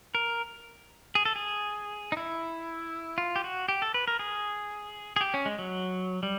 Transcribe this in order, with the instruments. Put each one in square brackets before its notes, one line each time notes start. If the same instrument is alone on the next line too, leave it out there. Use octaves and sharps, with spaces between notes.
[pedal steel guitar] A#4
G#4
A4
G#4
D#4
E4
F4
G4
F#4
G4
A4
B4
A#4
G#4
G#4
G4
C#4
G#3
F#3
G3